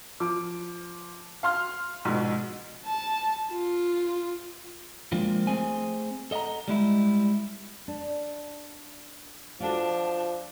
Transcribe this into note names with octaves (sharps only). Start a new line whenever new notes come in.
F3 D6
F5 C6 F6
A#1 G#2 B2
A5
F4
F3 G#3 A#3 C4 D4 F4
A3 C4 G#4 C5 G#5
A4 D#5 F5 F#5 A#5
G3 G#3 E4
D4
F3 D4 F4 F#4 A4